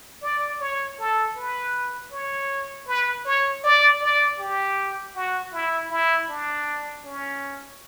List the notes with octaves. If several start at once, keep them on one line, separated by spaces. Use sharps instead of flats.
D5
C#5
A4
B4
C#5
B4
C#5
D5
D5
G4
F#4
E4
E4
D4
C#4